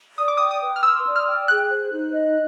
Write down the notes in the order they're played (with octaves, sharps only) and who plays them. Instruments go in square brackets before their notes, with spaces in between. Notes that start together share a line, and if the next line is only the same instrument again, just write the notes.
[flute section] D5 [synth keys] D#6
[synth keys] D6
[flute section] G5 [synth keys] D#6
[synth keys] D#6
[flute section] B4
[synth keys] F6
[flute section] C6 [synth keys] E6
[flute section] D5
[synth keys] F6
[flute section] G5
[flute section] G#4 [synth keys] F#6
[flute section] C5
D#4
D#5